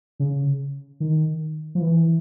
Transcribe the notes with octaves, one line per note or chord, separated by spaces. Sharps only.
C#3
D#3
F3
E3